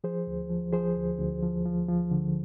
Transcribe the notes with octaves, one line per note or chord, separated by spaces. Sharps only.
F3 G#4 C5
D2
F3
F3 G#4 C5
D2
D2
F3
F3
F3
D3